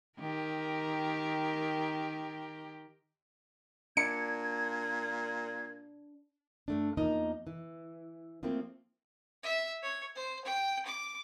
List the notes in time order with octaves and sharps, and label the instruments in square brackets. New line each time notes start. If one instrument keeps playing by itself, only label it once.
[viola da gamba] D#3 G4 A#4
[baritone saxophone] A#2 [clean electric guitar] D4 [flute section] G#6 [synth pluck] C#7
[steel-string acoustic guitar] G2 A3 D4
E2 F3 A#3 D#4 D#5 A#5
E3
F3 A3 A#3 C4 E4
[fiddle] E5
C#5
C5
G5
D6